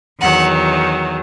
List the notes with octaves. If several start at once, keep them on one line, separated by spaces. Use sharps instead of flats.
E2 D#3 F#3 F#5